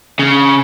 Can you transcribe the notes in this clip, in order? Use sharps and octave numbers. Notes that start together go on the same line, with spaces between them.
C#3